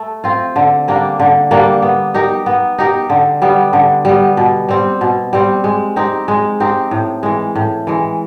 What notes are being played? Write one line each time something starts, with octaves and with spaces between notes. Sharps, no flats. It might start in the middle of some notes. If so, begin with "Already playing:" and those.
Already playing: A3
C4 F4
D3
G3 A#3 D4
D3
G3 A#3 D4
B3
D#4 G4 A#4
B3
D#4 G4 A#4
D3
G3 B3
D3
G3 B3
B2
G3 C4
B2
G3 C4
G#3
C4 D#4 G4
G#3
C4 D#4 G4
A2
E3 G#3
A2
E3 G#3